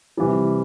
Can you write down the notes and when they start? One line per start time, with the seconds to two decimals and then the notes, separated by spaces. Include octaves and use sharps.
0.17 C3 E3 G3